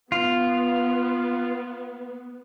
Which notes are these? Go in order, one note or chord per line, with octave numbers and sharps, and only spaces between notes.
B3 F4